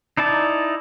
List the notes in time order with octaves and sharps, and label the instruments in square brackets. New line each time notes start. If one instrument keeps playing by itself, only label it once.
[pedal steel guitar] D#4 E4 D5 A5